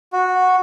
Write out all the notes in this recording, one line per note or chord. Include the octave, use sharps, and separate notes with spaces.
F#4